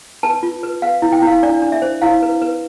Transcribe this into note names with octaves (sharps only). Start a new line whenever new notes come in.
B4 A5
F4
B4
B4 F5
E4
G5
E4
F5
D4 D5
D4
E5
C5
E4 F5
B4
B4